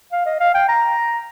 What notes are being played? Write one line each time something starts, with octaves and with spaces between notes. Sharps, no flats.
F5
D#5
F5
G5
A#5